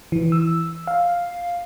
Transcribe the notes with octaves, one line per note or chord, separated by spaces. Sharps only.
E3
E6
F5